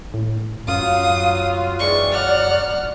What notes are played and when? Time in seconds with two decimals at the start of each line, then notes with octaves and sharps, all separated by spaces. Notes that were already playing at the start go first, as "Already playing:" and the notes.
0.14 A2
0.68 F#2 F#3 F4 F5 D#6
1.80 D#3 E3 G#3 D5 C#6
2.13 F#3 F#5 F6